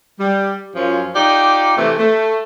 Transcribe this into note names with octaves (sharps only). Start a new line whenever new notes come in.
G3
F#2 F3 C#4 F4
D#4 F4 G4 D5
C3 E3 A3
A3